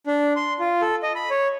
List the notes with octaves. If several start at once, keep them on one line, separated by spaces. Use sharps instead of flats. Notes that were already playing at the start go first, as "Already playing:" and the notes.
D4
C6
F4
A4
D#5
B5
C#5